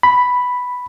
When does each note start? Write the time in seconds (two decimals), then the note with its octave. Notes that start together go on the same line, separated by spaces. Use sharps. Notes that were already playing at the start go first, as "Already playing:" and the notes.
0.03 B5